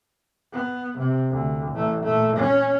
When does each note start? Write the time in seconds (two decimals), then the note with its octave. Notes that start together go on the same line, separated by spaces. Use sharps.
0.53 B3
0.99 C3
1.31 D2
1.72 A1 A3
2.04 A#2 A3
2.37 C#4